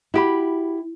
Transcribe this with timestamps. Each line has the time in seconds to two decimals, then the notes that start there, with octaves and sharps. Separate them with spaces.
0.14 E4 F#4 G4 B5